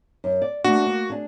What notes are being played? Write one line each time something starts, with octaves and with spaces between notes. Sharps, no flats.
F#2
D5
A3 A#3 D4 F#4
A#3
D4 G#4